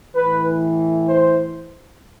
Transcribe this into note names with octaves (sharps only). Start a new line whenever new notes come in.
A2 E3 B4
C5